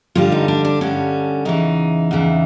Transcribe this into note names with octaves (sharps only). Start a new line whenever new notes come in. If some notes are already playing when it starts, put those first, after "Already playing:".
G2 D3 G3 F4
D#4
D4
D4
G2 D3 G3 C#4
E2 C#3 E3 D#4
E2 C#3 E3